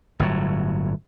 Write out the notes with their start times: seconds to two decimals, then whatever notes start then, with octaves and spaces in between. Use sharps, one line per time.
0.19 G1 A2 F#3